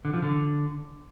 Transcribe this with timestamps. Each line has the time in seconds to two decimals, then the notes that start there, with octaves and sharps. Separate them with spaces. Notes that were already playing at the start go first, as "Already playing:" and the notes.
0.05 D3
0.14 F3
0.22 D3